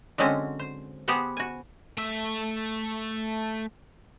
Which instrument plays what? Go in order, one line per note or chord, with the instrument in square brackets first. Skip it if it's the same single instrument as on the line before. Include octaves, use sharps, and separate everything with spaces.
[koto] D3 F#3 G#3 C4 C#4
C5
B3 G4 G#4 C5 F#5
F#4 G#5
[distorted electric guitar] A3 E5